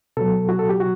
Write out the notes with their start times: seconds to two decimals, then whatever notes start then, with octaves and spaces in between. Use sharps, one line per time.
0.17 B2 F#3 A4
0.49 F#4
0.59 A4
0.69 G4
0.80 F#4